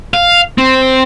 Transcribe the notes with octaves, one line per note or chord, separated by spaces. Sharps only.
F5
C4